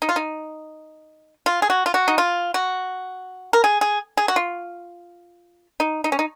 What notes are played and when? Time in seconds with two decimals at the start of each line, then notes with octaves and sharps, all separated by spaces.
0.02 D#4
0.09 F4
0.16 D#4
1.46 F4
1.62 G#4
1.70 F#4
1.86 F4
1.94 F#4
2.08 D#4
2.18 F4
2.54 F#4
3.53 A#4
3.64 G#4
3.81 G#4
4.17 G#4
4.28 F#4
4.36 F4
5.80 D#4
6.04 D#4
6.12 C#4
6.19 D#4